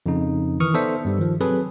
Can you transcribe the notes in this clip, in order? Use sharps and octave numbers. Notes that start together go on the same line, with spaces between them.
F2 C#3 D#4
D#3 E3 C#6 D#6 F6
B3 D#4 A4 C5 D5 E5
G2 G3
D#3 F3
F#3 C4 G#4 A4 B4 C#5